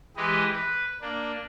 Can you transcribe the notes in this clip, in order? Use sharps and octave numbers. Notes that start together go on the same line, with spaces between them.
E3 G#3 G4 B4 D#5
B4
A#3 D4